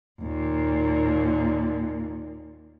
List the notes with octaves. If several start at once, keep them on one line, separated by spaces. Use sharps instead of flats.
D#2 A#2